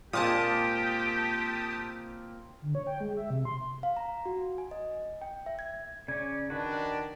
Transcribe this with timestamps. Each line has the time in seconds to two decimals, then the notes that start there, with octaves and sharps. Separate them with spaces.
0.13 A#2 G#3 A#3 C4 G4 A5 D#6
2.62 D3
2.75 C#5
2.87 G5
3.00 G#3
3.17 E5
3.30 C3
3.45 C6
3.83 F5
3.96 A#5
4.26 F#4
4.58 G#5
4.71 D#5
5.22 G5
5.46 E5
5.59 G#6
6.08 C#3 C#4 D5 G#6
6.50 D#3 D4 F#4 B4